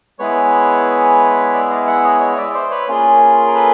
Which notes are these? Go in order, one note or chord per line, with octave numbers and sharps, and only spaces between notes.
G#3 B3 E4 G#4 B4 C#5
D5 E5
D#5 F5
E5 F#5
C#5 D#5
C#5 D#5
D5 E5
C5 D5
B4 C#5
A#3 C#4 F4 G#4
A#4
A4 B4